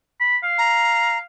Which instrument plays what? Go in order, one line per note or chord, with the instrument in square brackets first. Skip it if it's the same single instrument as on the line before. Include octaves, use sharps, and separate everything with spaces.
[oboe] B5
F5
[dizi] A#5